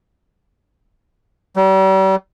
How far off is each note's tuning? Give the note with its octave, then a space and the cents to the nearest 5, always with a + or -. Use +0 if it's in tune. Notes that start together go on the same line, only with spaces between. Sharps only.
G3 -40